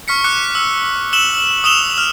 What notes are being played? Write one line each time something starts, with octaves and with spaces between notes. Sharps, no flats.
C#6 F6 B6 C#7
D6 F#6 C#7
E6
E6 E7 F#7 G7
D#6 E6 E7 F7 G7
F6 F7